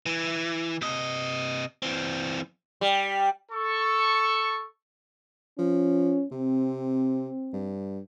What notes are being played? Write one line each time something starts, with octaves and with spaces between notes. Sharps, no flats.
E3
C3 D#5
E3 C4
G3
A4 C#6
F3 C#4
C3 C4
G2